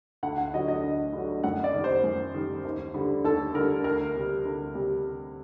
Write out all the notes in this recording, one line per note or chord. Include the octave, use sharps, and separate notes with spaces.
D2 F#5
F#5
D3 F#3 D#5
D#5
D2
D3 F#3
F#2 F#5
D5
D#3 G3
C5
F#2
D#3 G3
D#2
D3 G3
D#2 A4
D3 G3 A#4
D2 A#4
C3 G3
D2
C3 G3